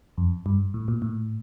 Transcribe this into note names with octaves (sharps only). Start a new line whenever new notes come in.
F2
G2
A2
A#2
A2